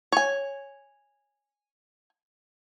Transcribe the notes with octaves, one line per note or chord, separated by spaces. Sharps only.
C#5 G#5